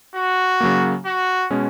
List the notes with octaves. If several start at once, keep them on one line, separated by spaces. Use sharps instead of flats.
F#4
C#3 F#3 A#3
F#4
B2 G#3 C#4